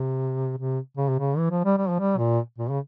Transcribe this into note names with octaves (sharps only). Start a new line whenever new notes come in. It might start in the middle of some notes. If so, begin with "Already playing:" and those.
Already playing: C3
C3
C#3
C3
C#3
E3
F3
G3
G3
F3
G3
A#2
A#2
C#3